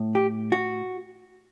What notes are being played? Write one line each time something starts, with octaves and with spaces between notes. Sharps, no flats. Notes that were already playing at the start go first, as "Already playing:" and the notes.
Already playing: A2
G4
F#4